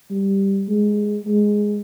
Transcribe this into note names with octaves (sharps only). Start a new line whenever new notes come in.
G3
G#3
G#3